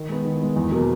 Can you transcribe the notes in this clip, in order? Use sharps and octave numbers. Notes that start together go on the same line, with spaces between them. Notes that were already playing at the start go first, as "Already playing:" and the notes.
Already playing: D#3
G#3 B3
D#3
G#3 B3
E2
B2 F#3 A#3